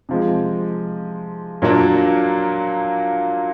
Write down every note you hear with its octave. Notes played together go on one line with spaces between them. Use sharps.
C3 F3 G#3
A#2 F#3 A#3 D4